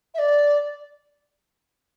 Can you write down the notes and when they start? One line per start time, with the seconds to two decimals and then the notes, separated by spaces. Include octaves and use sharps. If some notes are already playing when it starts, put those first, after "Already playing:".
0.14 E5
0.18 D5